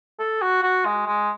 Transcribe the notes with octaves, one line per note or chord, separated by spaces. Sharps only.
A4
F#4
F#4
G#3
G#3